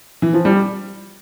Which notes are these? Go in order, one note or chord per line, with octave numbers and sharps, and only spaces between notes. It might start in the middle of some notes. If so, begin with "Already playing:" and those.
E3
F3
G3